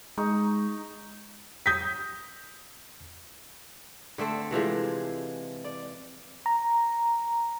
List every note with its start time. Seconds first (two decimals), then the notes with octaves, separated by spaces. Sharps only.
0.18 G#3 D#4 C#6
1.66 D#6 G6 A#6 B6
4.18 D3 A3 C4 A4
4.51 C3 E3 F3 G#3
5.64 D5
6.46 A#5